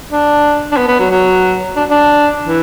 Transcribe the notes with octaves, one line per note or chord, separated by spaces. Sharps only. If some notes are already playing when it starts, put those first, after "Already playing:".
D4
D4
B3
B3
F#3
F#3
D4
D4
E3